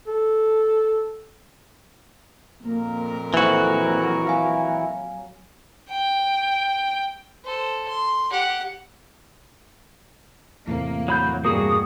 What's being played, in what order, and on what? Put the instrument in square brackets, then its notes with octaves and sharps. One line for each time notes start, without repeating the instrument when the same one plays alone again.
[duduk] A4
[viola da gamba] F2 A#2 A#4 [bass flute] A#3
[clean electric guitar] E3 F#4 [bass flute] F#3 [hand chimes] A#3 A4 C5
[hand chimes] F5 G#5
[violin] G5
[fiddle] A4 C5
C6
G4 F#5
[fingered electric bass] E2 A2 C3 [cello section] A#3
[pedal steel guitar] F#3 B5 G6
[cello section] G2 B2 G3 [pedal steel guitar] A#3 F#4 G#4 [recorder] D#6